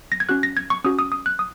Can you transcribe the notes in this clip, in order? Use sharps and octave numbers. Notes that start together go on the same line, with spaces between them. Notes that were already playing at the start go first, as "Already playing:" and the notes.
A#6
G#6
C#4 F#4 F#6
A#6
G#6
C#6
C#4 F#4 D#6
D#6
D#6
F#6
D#6